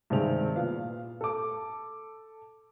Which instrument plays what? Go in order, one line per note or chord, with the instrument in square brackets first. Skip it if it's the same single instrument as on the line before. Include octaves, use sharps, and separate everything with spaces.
[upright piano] G2 C3 D#3 G#3 C4 F7
A#2 B3 F5
A4 D6